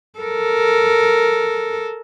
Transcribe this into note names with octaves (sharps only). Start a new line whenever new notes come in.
A4 A#4